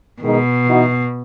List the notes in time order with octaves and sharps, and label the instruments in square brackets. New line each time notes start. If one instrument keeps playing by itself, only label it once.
[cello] B2 [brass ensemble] D#3 G#3 D#4
[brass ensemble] E3 B3 D#4 F#4